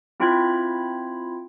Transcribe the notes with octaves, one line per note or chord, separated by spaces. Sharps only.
C4 E4 F4 G5 B5 G#6